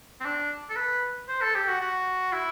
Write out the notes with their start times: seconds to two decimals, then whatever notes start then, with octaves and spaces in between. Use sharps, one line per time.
0.20 C4
0.25 D4
0.69 A4
0.76 B4
1.29 C5
1.41 A4
1.55 G4
1.68 F#4
1.81 F#4
2.33 E4